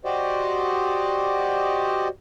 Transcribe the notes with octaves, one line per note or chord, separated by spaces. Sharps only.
F#4 G4 C5 D5 D#5